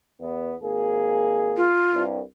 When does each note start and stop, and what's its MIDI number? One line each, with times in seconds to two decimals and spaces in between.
0.20 0.55 40
0.20 0.55 59
0.62 1.68 32
0.62 1.68 58
0.62 1.68 68
1.57 2.03 65
1.93 2.20 36
1.93 2.20 43